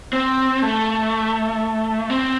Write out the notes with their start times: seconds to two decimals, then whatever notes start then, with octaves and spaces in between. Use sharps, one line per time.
0.13 C4
0.62 A3
2.10 C4